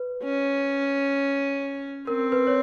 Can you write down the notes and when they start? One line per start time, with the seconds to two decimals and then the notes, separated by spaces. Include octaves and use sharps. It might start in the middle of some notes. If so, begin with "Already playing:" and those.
Already playing: B4
0.23 C#4
2.07 C4 A#4
2.32 B4
2.47 C#5